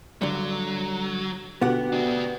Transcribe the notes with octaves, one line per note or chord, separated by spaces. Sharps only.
G2 D3 F#3
B2 D3 B3 G4 F#5
D4 F#4